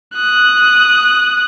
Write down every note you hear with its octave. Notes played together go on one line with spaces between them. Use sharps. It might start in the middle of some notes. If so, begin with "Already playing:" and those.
D#6 F#6